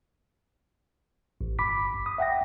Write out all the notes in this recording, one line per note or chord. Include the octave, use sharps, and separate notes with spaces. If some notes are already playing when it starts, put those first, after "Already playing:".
A1
G1 B5 D6 B6
D#6
E5 F#5 G5 A#6